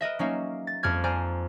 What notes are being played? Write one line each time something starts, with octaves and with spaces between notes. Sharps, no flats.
A#4 B4 D#5 E5
F#3 A#3 C#4 D#4 E5 F5
A6
F2 G3 F6 G#6
C5 D5 G#5 A#5 F6